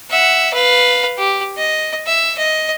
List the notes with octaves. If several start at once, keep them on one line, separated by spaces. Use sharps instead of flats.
E5 F#5
B4 F5
G4
D#5
E5
D#5